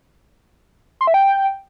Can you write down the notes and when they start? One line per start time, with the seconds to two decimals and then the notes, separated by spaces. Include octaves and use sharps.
1.01 C6
1.07 E5
1.14 G5